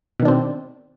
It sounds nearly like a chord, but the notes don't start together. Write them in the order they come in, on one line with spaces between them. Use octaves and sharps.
B2 D#3 D4 C4